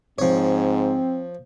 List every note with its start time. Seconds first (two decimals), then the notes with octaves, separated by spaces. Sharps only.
0.19 G#2 F3 C4 C#5